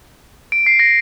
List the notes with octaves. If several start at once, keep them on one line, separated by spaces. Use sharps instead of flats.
D7
C7
A#6